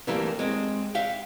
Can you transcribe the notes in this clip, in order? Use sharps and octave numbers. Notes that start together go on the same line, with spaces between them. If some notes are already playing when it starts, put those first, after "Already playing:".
C3 E3 G3 A3 A#3 C4
G#3 C4
E5 F5 G5